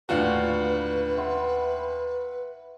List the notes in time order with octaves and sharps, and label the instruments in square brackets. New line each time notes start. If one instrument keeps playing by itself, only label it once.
[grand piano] D#2 F4 F#4 [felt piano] A2 D3 D4 [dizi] B4
[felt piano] E5 F#5 C6